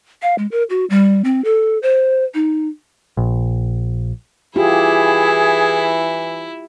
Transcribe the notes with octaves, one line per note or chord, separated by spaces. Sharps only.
F5
G#3
A#4
F#4
G3
C4
A4
C5
D#4
A#1
E3 E4 F4 G4 G#4